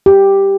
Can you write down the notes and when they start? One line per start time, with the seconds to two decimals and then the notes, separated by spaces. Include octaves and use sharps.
0.06 G4